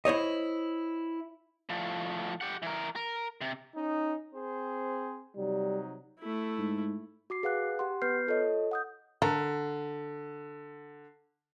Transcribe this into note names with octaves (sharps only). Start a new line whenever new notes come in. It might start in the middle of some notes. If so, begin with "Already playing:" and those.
E4 C5 C#5 D#5
A2 F3
G4 F#5
E3 A#4
A#4
C3
C#4 D#4
C4 G#4 C5
C3 F#3 G3 D#4
A3 E4
G#2
F#4 D6 C7
G#4 B4 F5 F#5 F#6
G4 F#5 C6
B3 B4 F6 G6 C7
F4 A4 C#5 D#5
F#5 D#6 G6
D3 A4 A#4